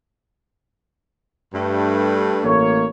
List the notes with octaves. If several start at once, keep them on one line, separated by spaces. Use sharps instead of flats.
G2 A3
A1 A#3 C#5